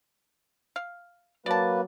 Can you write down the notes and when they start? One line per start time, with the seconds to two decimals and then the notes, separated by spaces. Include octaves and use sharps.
0.76 F5
1.46 F#3 A#3 B4 D5 A5